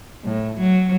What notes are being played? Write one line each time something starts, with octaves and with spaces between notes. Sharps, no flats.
A2
F#3